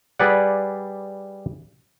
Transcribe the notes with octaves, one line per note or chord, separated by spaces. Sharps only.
G3 G#4 B4 D5 F#5